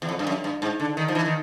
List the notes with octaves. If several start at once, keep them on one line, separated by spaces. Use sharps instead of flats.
E2
F2
G2
F#2
G2
G#2
D3
D#3
F3
E3
D#3